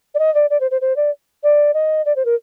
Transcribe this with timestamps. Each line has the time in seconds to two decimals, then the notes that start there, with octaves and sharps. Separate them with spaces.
0.14 D5
0.19 D#5
0.35 D5
0.50 D5
0.60 C5
0.71 C5
0.81 C5
0.96 D5
1.43 D5
1.74 D#5
2.05 D5
2.16 C5
2.25 A#4